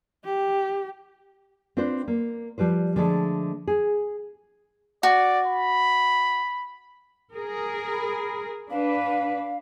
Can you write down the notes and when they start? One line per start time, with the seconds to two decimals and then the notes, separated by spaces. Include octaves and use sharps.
0.25 G4
1.77 C4 D4 F4 B4 C5
2.08 A#3
2.58 F3 G3 B4 C5
2.96 D3 F3 G#3 A3
3.67 G#4
5.03 F#4 D5
5.47 B5
7.34 G#4 A#4
7.92 B5
8.70 D4 B4 F5